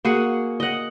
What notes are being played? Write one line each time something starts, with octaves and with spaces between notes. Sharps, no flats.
A#3 F#4 G#4 F#5
D#5 F#5